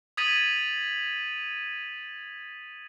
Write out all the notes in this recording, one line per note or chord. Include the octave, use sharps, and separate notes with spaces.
D#6 G#6 A6 B6 D#7 F#7